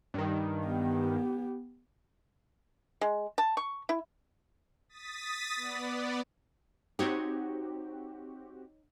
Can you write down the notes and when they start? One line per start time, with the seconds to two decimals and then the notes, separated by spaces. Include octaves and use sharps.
0.14 G2 D#3
0.65 B3 G4
3.01 G#3
3.38 A5
3.57 C#6
3.89 E4
4.89 D#6 A6 B6
5.56 B3 D5
6.99 C4 D#4 F#4 G4 C#5